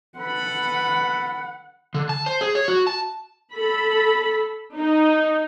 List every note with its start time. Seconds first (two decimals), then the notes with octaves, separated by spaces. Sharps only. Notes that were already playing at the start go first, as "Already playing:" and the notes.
0.18 A4 B4 F#5 B5
1.94 D3
2.09 A5
2.26 C5
2.41 G#4
2.55 C#5
2.68 F#4
2.87 A5
3.53 A4 B5
4.75 D#4